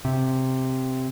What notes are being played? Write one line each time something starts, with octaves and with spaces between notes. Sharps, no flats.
C3